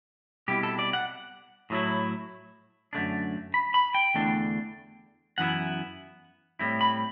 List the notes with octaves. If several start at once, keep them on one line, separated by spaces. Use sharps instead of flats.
B2 G3 C4 E4 G4
A4
D5
F#5
A2 F#3 A3 E4
F#2 D3 A3 D4
B5
B5
G5
E2 D3 A3 D4
F#2 E3 B3 E4 F#5
A2 G3 C4 E4
B5